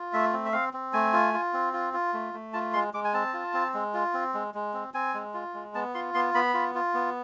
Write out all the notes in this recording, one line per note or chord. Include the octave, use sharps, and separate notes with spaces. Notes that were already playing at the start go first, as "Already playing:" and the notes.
Already playing: F4
A3 E5
C4
E5
C4 F5
C4
A3 G#5
F4
F4
C4
F4
F4
A3
A3
F4 A5
G#3 C6
G#3 D6
G#5
C4 A5
F4
C4
G#3
F4
C4
G#3
G#3
C4
C4 G#5
G#3
F4
G#3
B3 A5
F4 C6
B3 C6
B3 B5
F4
F4
B3